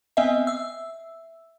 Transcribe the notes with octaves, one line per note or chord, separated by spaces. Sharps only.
B3 C4 D#5 E5
E5 E6